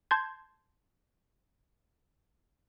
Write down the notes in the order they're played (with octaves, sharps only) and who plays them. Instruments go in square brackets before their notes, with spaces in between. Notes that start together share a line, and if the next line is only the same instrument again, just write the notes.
[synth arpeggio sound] A5 C6 G6 G#6